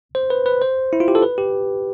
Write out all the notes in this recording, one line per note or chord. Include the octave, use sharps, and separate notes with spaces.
C5
B4
B4
C5
E4
F4
G4
A4
B4
G4